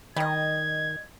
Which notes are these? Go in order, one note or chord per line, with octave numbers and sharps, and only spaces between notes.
D#3 G3 D#5 G#6